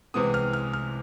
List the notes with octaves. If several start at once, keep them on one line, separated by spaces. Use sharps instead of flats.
C2 C3 E3 G#3 B3 D#6
F6
F6
F6